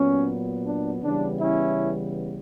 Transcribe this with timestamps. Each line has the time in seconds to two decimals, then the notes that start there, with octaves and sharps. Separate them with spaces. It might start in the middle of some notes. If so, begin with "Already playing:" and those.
Already playing: A#2 F#3 B3 C#4
0.66 D4
1.03 C#3 E3 G3 B3 D4
1.40 C#4 E4